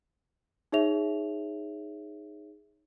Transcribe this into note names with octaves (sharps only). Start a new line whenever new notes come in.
D#4 G#4 C#5 E5 F7